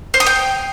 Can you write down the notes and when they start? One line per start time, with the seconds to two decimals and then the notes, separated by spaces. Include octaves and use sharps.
0.14 C5
0.20 D#6
0.27 G5